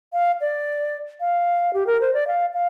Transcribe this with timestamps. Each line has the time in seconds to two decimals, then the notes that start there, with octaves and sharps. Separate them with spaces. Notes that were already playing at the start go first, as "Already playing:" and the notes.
0.13 F5
0.41 D5
1.20 F5
1.74 G4
1.87 A#4
2.01 C5
2.14 D5
2.27 F5
2.54 F5